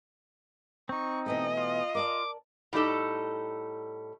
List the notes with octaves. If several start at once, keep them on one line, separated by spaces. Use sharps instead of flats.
C4 D#4 C#6
B2 E3 A3 D#5
F4
A#4 D5 A5 D6
A2 G3 D#4 A4